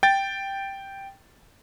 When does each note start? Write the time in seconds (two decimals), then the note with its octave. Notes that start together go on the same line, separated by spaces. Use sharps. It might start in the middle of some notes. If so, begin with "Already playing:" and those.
0.03 G5 A6